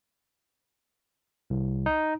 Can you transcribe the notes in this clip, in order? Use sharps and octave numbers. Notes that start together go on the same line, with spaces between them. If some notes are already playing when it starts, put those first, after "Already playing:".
C2
D#4